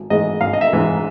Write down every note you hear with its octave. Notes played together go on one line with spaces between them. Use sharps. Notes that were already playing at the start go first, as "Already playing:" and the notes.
Already playing: G#1
G#2 E3 G#3 D#5
G#1 F5
D#5
E5
G#2 E3 G#3